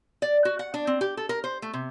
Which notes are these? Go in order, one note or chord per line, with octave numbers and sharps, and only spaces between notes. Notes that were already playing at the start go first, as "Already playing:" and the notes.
D5
F#4
F#5
D4
C4
G4
A4
A#4
C5
A3
C3